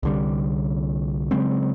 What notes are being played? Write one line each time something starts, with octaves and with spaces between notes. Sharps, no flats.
C2 D3 G3
C#3 F#3 G#3 C4